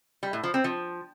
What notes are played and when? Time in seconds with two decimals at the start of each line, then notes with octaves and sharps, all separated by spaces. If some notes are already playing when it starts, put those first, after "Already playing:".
0.23 G3
0.33 A2
0.44 F3
0.54 C4
0.64 F3